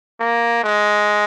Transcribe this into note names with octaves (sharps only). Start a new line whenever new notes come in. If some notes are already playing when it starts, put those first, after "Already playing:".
A#3
G#3